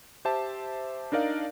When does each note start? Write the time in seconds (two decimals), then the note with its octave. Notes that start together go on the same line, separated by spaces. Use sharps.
0.25 G4 C5 E5 A5
1.12 D4 D#4 A#4 D5 F5